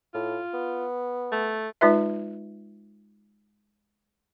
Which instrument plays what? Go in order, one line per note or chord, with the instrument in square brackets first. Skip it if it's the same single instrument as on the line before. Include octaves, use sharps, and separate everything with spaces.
[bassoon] A2 [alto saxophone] F4
[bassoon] B3
[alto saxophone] A3
[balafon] G#3 D#4 F4 B4 E5